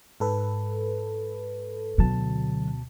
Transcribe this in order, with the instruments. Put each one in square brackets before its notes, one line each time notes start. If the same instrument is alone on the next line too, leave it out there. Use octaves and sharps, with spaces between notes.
[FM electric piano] G#2 A4 B4
[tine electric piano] D2 B2 A5 [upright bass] D3 F#3